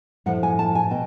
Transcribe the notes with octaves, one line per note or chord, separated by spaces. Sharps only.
A2 F3 A3 F#5
G#5
A5
G#5
B2 G5